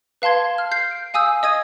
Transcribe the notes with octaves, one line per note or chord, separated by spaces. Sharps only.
B4 F5 A5 C6 G#6
F6
G6 C7
D7
F5 G#5 D#6 E6 G6
D#5 D#6 G#6 D#7